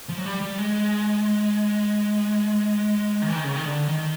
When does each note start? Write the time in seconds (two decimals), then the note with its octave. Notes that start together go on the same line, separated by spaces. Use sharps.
0.09 F3
0.18 F#3
0.25 G3
0.41 G3
0.58 G#3
3.22 D#3
3.28 E3
3.36 D#3
3.44 C#3
3.56 D#3
3.65 D3
3.88 D#3